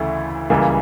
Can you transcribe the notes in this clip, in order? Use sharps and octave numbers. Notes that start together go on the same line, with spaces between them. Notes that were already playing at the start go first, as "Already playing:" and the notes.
Already playing: D2 C#3 E3 A3 E4
C#2 C#3 E3 G3 A#3